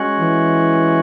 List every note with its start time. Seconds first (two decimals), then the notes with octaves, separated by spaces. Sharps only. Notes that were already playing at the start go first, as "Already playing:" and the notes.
Already playing: G#3 C#4 F#4
0.20 E3